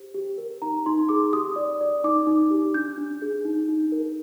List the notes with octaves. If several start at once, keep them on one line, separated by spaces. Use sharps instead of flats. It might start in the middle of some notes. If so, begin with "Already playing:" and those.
Already playing: G4 C5
G4
A#4
D#4 A#5
D#4 C6
G#4 D6
G4 D#6
D5
D5
D#4 D6
D#4
G4
D4 G6
D4
G#4
D#4
D#4
A#4